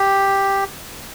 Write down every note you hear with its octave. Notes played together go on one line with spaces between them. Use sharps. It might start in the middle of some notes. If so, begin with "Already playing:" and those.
Already playing: G4